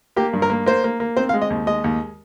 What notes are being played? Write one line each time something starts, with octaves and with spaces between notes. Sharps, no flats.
A#3 G4
G2
A#4
A#3
A#3 C5
A#3
A#3
C4 C5
F5
G#3
D#5
D#2
G#3 D#5
D#2